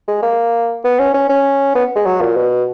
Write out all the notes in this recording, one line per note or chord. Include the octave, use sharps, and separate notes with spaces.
G#3
A#3
B3
C#4
C#4
C#4
B3
G#3
F#3
A#2
B2